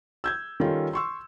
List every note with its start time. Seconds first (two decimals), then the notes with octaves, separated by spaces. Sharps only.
0.24 E6 G6 G#6
0.60 D#3 G3 C#4 F4 A4
0.93 C6 C#6 E6